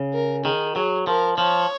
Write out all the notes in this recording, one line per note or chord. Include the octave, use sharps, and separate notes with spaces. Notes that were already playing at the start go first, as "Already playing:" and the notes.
Already playing: C#3
A#4
D#3 G#4
F#3 G#4
F3 A#4
F3 C#5